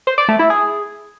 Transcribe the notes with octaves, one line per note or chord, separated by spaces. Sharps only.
C5
D5
A3
E4
G#4